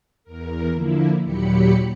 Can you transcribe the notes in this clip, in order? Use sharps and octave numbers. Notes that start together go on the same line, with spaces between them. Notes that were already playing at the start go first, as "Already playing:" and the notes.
E2 A#4
D3 F3 A#3 E4
D#2 A#2 F#3 G4 B5 C#7